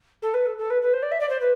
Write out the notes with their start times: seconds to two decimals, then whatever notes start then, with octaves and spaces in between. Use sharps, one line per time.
0.22 A4
0.33 B4
0.46 A4
0.58 A4
0.70 B4
0.81 B4
0.93 C5
1.02 D5
1.11 E5
1.20 D5
1.29 C5
1.40 B4